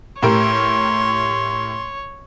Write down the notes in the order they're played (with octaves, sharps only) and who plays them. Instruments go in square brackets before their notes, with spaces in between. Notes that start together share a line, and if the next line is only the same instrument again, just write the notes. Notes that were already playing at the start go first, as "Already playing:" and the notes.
[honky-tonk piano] A2 G4 A#4 [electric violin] C#5 [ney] C6